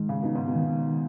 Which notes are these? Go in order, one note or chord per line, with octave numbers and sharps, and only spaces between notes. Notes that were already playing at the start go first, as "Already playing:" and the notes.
Already playing: G#2 D#3 G#3
C#3
B2 D#4
G#2
B2
D#3
D#3